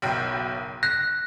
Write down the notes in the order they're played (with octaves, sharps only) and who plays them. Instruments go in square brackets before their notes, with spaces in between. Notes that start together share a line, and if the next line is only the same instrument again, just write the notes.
[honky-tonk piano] F#1 B1 G5
[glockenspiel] F#6 [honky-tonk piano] A#6